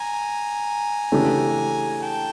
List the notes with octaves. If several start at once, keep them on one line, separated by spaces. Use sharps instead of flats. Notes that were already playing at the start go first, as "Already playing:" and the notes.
Already playing: G#5 A#5
C#3 E3 A3 D4 G4
G5 A5